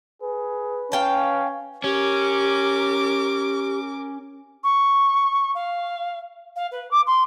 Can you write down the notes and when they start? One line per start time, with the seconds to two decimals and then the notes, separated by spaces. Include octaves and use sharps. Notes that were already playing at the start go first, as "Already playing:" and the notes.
0.22 G#4 B4
0.92 C#4 F5 G5 A5
1.84 C#4 G4 A#4 D6
4.63 C#6
5.55 F5
6.56 F5
6.71 B4
6.91 D6
7.06 C6